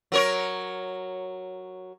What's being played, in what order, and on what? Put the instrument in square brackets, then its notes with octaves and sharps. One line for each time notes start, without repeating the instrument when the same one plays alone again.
[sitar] F#3 A#4 C#5